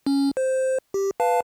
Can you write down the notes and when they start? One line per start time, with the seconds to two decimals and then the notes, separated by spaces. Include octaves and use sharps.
0.06 C#4
0.37 C5
0.94 G4
1.20 B4 F5 A5